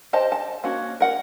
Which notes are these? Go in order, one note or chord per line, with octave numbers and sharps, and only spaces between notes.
G4 C5 D#5 A5
A5
A#3 C#4 F#4
A#4 F#5